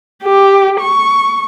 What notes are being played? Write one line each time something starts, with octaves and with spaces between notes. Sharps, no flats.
G4
C#6